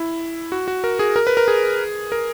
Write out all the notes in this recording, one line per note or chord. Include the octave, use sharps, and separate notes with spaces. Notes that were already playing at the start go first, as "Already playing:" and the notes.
Already playing: E4
F#4
F#4
A#4
G#4
A#4
B4
A#4
G#4
A#4